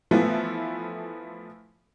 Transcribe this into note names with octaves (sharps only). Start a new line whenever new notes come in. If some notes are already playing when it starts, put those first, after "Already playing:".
E3 F3 A3 B3 E4 F4